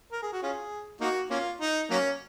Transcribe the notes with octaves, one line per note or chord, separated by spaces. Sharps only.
A#4
G#4
F#4
C#4 F4 G#4
A#3 D#4 F#4
A#3 C#4 F4
D#4
F#3 A#3 C#4